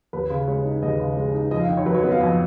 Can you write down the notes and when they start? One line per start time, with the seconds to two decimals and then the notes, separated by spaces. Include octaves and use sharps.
0.13 D#2 B4
0.30 C#3
0.47 G#3 C#5
0.65 D#4
0.82 D#2 D#5
1.00 C#3
1.17 G#3
1.34 D#4
1.51 F2 D#5
1.60 F5
1.69 D#3 D#5
1.77 C#5
1.86 F#3 B4
1.95 C#5
2.03 B3 D#5
2.12 F5
2.21 F2 D#5